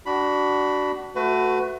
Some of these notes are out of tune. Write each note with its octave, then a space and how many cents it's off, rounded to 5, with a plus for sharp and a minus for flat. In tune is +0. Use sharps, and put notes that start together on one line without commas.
D4 +0 F#4 +25 B5 +0
A3 +0 F#4 +0 B4 +30